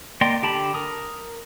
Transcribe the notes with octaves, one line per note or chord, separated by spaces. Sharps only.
A#3 D5 D#5 G5 C6
D3 G4 G5 A5 B5
A#4 D#6